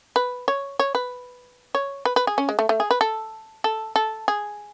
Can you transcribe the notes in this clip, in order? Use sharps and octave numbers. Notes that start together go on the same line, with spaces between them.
B4
C#5
C#5
B4
C#5
B4
B4
G#4
C#4
G#3
A3
A3
G#4
B4
A4
A4
A4
G#4